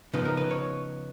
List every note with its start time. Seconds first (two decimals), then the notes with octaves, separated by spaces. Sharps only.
0.13 C#3 F3 B3 D#4 B4
0.25 A#4
0.37 B4
0.51 C#5